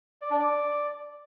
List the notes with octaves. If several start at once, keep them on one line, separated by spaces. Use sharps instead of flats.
D5
D4
D5